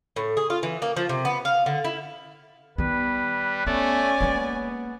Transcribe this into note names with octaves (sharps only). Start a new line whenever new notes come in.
A2
G#4
F4
E3
A#3
F3
C3
B3
F5
D3
E4
D#3 G3 B3 B4
A3 B3 C#4 D5 G#5
G#3 A#3 B3